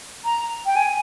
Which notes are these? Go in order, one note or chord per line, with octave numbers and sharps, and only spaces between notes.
A#5
G5
G#5